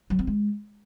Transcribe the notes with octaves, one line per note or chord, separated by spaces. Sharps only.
F#3
C4
G#3